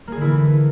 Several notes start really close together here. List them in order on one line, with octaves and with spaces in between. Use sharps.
A#3 G#4 D3 E4 E3